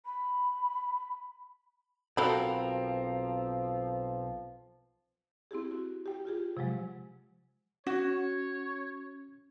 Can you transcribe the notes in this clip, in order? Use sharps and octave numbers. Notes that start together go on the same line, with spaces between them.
B5
B1 F3 C4 F#4 A4 A#4 B5
C4 E4 G4 G#4
F#4
G4 G5
F4 G4 G#4
C3 F3 F#3 G#3
C#4 F#4 C#5